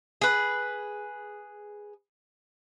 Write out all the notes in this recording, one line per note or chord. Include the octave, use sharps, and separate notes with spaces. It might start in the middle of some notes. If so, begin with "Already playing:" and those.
G#4 B4